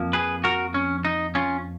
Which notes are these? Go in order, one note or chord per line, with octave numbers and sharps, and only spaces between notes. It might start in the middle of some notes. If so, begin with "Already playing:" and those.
Already playing: F2 F3 A#3
G#4 B4
F#4 A#4
C#4
D#4
C#4 F4